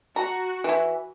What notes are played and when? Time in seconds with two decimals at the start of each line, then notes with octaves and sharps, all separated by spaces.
0.16 F#4 A#5
0.64 E3 E4